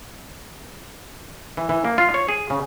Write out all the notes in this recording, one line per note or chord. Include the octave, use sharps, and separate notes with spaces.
E3
E3
A#3
F4
C#5
G#4
C#3